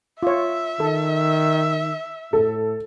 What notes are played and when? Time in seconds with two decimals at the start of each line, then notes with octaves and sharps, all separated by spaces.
0.23 F4 C#5 E5
0.80 D#3 A4
2.33 A2 A4